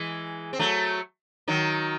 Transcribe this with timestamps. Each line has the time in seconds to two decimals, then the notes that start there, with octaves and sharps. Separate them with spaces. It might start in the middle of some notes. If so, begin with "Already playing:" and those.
Already playing: E3 G#3
0.53 C4
0.59 F#3 A3
1.48 D#3 F#3